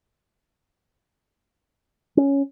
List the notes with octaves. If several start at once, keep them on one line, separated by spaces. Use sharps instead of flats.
C#4